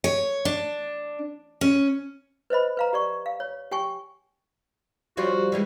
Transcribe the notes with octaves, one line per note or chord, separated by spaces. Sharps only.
C#5
D4
C#4
B4 C5 D#5 B5
B4 F5 A#5
G4 D5 C#6
F5
C#5
G4 G5 G#5 C#6
F3 G3 F4 F#4
E3 G3 G#3